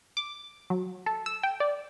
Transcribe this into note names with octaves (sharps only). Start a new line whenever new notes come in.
D6
F#3
A4
E6
G5
D5